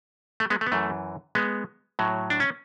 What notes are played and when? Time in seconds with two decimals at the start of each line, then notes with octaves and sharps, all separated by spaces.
0.40 A3
0.50 G#3 B3
0.61 A3
0.67 B3
0.72 F#2 E3 A3
1.35 G#3 B3
1.99 A2 F#3
2.30 D4
2.40 C#4